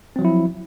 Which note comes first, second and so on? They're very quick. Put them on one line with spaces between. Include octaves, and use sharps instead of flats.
C4 F#3 F3 E4